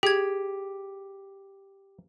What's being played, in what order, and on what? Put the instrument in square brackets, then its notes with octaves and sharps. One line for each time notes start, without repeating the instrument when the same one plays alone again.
[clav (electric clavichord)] G4 [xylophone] G#4 G#6